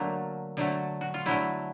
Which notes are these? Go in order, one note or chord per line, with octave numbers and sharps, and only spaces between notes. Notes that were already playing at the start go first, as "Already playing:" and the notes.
Already playing: D3 F#3 A3 A#3
D3 F#3 A3
F#4
F4
D3 F#3 A3 E4